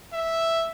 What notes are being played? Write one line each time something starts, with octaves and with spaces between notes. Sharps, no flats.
E5